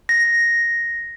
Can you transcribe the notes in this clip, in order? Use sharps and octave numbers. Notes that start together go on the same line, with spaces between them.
A#6